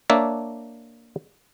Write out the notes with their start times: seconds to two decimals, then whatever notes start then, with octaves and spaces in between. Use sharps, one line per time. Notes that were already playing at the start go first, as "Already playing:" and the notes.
0.10 A#3 D4 C#5 E5 A5